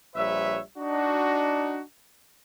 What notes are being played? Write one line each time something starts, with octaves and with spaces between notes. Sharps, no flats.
A#1 G3 B4 C#5 E5
D4 D#4 F#4